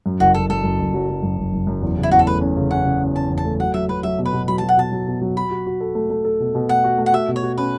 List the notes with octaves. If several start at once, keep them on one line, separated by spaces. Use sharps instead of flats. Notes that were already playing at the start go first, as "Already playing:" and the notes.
F#2
F#1 F#4
F#1 A4
F#2 A4
F#2
F#1
F#3
F#3
F#2
F#1
F#1
F#2
E2
C#3
E4
E2 F#4
A4
A3 B4
C#4
C#3
C#4 F#5
C#3
C#4
C#4 A5
E2
A5
A3
F#3 F#5
F#3 E5
F#3 B4
F#3 E5
B2
B4
B2
F#3 B5
F#3 A5
F#5
B2 A5
F#3
B2
F#3
F#4 B5
F#4
F#4
A4
A3
A3
A4
B2
B2
A3 F#5
F#4
A3
F#5
F#4 E5
B2
C#5
F#4
C#4 B4